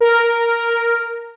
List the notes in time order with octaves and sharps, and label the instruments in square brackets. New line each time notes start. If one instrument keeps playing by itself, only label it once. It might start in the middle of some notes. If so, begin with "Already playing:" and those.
[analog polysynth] A#4